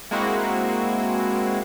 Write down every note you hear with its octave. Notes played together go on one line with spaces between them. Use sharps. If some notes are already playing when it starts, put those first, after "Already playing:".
G#3 A#3 C4 E4 F#4